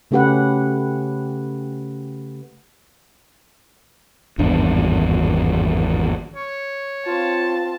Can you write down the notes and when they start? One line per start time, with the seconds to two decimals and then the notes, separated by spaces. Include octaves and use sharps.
0.11 C#3 A3 C#4 G4 B4 F#5
4.38 G#1 E2 G2 D4
6.35 C#5
7.06 C4 F4 A5